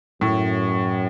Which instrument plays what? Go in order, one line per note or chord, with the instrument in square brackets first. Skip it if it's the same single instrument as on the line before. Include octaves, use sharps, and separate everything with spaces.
[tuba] F#2 [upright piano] A2